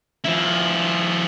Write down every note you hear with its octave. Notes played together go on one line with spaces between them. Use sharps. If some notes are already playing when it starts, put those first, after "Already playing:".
F3 E4